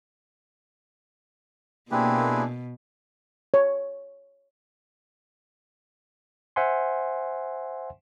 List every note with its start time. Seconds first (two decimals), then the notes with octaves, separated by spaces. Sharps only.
1.91 B2 A#3 C4 D4 E4 G4 G#4 B4
3.54 C#5
6.56 C5 E5 F#5 G#5 C6